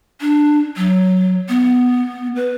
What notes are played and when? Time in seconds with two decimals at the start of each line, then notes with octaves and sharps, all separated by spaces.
0.21 D4
0.76 F#3
1.49 B3
2.36 B4